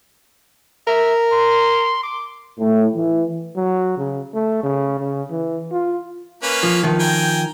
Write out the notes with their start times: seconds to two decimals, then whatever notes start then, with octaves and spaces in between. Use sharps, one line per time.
0.87 A#4 E5
1.32 C6
2.03 D6
2.60 A2
2.95 E3
3.57 F#3
3.98 C#3
4.34 A3
4.64 C#3
4.99 C#3
5.31 E3
5.72 F4
6.43 A#3 C#4 B4
6.63 F3
6.83 D#3 F3
7.00 G5 G#5 A#5